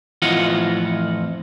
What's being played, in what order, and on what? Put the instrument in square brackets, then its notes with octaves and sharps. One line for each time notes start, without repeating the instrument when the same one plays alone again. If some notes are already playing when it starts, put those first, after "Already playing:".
[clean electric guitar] F2 A2 E3 F4 D#5 F#5